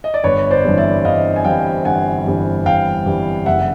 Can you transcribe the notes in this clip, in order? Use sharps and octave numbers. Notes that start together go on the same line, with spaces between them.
D#5
D5
G1 B4 C#5
C5 D5
G2 E3 G3 C4
D5 E5
G1 D#5 F5
G#5
G2 E3 G3 C4 F5 G5
G1 F#5 G#5
G2 E3 G3 C4
G1 F5 G5
G2 E3 G3 C4
F#1 E5 F#5